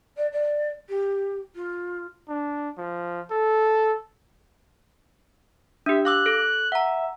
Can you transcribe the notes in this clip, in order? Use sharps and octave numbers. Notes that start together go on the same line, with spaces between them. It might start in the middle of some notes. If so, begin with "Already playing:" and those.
D5
D5
G4
F4
D4
F3
A4
D4 G4 E5
F5 D6 E6 F#6
A4
E5 F#5 A#5